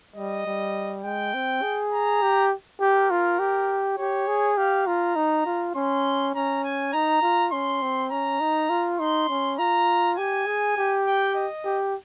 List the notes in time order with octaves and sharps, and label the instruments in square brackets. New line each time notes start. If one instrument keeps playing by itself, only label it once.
[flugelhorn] G3 [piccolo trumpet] D#5
[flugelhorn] G3
[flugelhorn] G#3 [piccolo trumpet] G5
[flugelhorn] C4
G#4
[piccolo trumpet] A#5
[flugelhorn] G4
[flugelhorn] G4 [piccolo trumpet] A#4
[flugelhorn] F4
G4
[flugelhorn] G4 [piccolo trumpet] C#5
[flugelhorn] G#4
[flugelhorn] G4 [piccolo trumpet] F5
[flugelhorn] F4 [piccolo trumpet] A#5
[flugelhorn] D#4
F4
[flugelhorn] C#4 [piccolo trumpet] C6
[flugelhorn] C#4 [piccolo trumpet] A#5
[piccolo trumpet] G#5
[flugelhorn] D#4 [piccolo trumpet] A#5
[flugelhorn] F4
[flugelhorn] C#4 [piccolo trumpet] C6
[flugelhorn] C4
[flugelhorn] C#4 [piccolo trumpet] A#5
[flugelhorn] D#4
F4
[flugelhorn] D#4 [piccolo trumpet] C6
[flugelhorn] C#4
[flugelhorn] F4 [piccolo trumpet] A#5
[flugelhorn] G4 [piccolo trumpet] G#5
[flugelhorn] G#4
G4
[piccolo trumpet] G5
D#5
[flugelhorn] G4